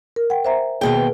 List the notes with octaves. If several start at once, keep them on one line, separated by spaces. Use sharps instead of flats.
A#4
F#5 G5
C5 E5 A#5
D#2 B2 G#4 G5
B4